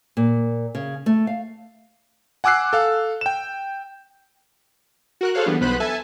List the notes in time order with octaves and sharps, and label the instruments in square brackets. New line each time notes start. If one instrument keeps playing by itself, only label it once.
[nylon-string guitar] A#2
C#3
A3
F5
[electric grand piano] F#5 G#5 D6 E6 F#6 C7
A4 F5
G5 E7
[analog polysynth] F#4 A#4 F#6
G#4 A4 C5 C#5 F5 F#6
E3 G3 B3 D4
B1 B3 B4 C5 B5 F#6
A4 E5 G#5 A5